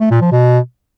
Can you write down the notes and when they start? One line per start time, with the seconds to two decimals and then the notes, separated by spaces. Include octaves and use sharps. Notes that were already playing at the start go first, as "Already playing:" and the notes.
0.01 A3
0.11 A#2
0.21 F3
0.32 B2